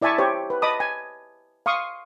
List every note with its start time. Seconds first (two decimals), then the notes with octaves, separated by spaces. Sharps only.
0.02 E4 D5 E5 G#5 A5 C#6
0.18 G4 C5 C#5
0.50 B4
0.62 D#5 A5 B5 D6 D#6
0.80 G#5
1.66 F5 C6 C#6 D#6